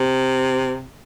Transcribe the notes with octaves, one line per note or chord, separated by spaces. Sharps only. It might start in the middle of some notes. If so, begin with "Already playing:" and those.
Already playing: C3